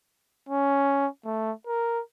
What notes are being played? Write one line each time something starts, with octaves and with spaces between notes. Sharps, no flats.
C#4
A3
A#4